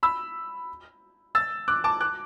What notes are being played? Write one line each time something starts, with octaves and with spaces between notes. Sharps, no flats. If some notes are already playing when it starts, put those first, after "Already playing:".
B5 E6
E6 A6
D6 F#6
A5 D6
D6 F#6